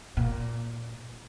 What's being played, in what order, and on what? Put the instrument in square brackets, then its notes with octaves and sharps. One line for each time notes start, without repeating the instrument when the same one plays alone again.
[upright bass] A#2